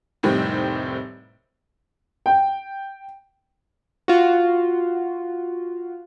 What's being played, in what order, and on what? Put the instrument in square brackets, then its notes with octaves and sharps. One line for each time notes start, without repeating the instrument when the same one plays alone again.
[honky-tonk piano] F1 A2 D#3 G3 C4 G4
[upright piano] G5
[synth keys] F4 F#4